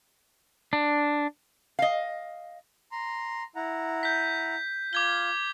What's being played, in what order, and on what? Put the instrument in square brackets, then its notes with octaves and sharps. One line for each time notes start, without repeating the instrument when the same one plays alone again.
[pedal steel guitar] D4
[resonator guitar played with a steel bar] D#5 F5
[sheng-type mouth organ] A#5 C6
E4 F#5 A#5
[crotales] G6 B6
[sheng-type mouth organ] F4 F6 [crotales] D6 G#6 G7